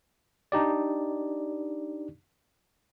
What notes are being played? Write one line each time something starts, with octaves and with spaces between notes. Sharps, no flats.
D4 D#4 G4 D5